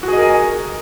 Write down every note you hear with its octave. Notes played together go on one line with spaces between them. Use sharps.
F#4 G#4 A#4 D#5 G#5